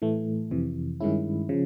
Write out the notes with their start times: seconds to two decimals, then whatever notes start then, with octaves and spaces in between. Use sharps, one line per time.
0.02 A2 E3 A3
0.51 F2 C3 E3
1.00 G2 D#3 G#3 C#4 E4
1.49 C#3 F3